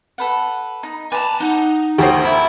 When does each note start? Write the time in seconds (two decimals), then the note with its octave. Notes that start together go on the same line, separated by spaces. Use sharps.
0.18 A4 B4 F#5
0.83 D#4
1.12 B4 D5 G#5 A5
1.40 D#4 F#5
1.98 D2 F#4 G4 A#4 C5 D#6
2.23 E4